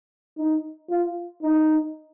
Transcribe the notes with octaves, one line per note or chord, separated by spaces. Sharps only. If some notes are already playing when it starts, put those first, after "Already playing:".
D#4
F4
D#4